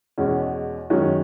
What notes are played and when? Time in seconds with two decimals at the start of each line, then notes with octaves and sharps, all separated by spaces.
0.18 E2 B2 G#3 C#4
0.90 F#2 D#3 G#3 C#4 F#4